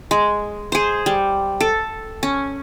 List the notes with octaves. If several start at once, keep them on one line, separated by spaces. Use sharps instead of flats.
G#3
G#4 C5
G3
A4
C#4